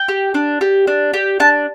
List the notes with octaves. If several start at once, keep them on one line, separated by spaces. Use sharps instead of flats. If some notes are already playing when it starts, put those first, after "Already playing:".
Already playing: G5
G4
D4
G4
D4
G4
D4 A5